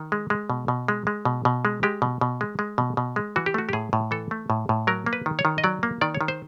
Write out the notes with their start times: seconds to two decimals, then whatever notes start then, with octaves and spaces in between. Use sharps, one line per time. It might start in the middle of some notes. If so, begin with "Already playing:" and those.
Already playing: D#3
0.12 G#3
0.30 G#3
0.50 B2
0.68 B2
0.88 G#3
1.07 G#3
1.25 B2
1.45 B2
1.65 G#3
1.83 G#3 G4
2.02 B2
2.21 B2
2.41 G#3
2.59 G#3
2.78 B2
2.97 B2
3.16 G#3
3.36 E3 F#4
3.46 G4
3.54 A3 F#4
3.69 G4
3.73 A2 G#4
3.93 A2
4.11 E3 A4
4.31 A3
4.50 A2
4.69 A2
4.87 F#3 A#4
5.06 A#3
5.13 B4
5.26 D#3
5.39 C#5
5.45 D#3
5.58 D#5
5.64 F#3 D5
5.83 A#3
6.01 D#3 D5
6.15 C#5
6.21 D#3
6.28 C5